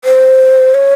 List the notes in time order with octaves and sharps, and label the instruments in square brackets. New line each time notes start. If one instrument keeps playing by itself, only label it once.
[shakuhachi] C5
C#5